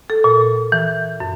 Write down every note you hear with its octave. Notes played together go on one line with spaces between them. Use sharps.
A4
A#2
E3
F#2